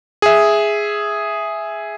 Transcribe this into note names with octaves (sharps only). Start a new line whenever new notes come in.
G#4 E5